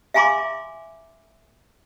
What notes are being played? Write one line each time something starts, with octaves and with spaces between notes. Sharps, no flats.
E5 F5 G#5 A#5 C6 D6